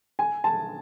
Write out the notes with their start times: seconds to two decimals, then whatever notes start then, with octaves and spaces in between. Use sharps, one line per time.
0.19 G#5
0.44 A5